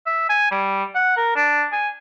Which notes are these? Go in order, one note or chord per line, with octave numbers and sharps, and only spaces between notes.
E5
G#5
G3
F#5
A#4
D4
G#5